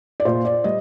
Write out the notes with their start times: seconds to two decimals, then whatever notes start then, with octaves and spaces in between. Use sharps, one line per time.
0.20 D5
0.25 A#2 C5
0.45 D5
0.64 G3 D#5